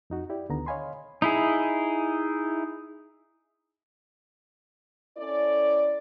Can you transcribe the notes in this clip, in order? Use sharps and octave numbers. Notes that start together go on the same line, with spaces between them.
F2 D#4 F#4
E4 G4 D5
D2 D3 D#3 B3 A#5
C#5 D#5 F5 G#5 B5 C6
D#4 E4 G#4
C#4 E4 A4 D5